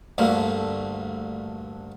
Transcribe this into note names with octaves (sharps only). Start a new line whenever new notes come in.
D2 G2 D3 A3 A#3